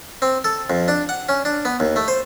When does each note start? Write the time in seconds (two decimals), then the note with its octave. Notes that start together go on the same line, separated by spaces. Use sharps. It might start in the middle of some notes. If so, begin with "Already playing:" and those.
0.22 C4
0.44 A4
0.70 F2
0.88 D4
1.09 F#5
1.29 C#4
1.45 D4
1.65 B3
1.80 D#2
1.96 A3
2.08 C5